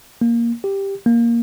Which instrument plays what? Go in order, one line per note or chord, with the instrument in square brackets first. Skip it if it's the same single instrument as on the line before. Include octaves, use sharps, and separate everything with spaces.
[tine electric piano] A#3
G4
A#3